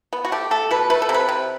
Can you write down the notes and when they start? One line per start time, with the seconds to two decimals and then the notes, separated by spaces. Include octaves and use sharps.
0.13 B3
0.25 F#4
0.32 A3 G4
0.51 A3 A4
0.71 B2 B4
0.90 A3 B4
1.02 A4
1.09 C3
1.14 B4
1.29 C3